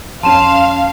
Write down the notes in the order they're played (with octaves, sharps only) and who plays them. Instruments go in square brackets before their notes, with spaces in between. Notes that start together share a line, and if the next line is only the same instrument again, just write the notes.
[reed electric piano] F2 C#4 [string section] F5 [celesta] A5 E7 [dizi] C6